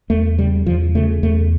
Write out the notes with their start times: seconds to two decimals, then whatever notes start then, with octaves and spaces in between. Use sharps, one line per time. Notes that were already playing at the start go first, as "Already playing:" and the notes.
0.10 E2 A3
0.38 C#3 G3
0.66 E2 F3
0.95 C#3 A3
1.23 E2 A3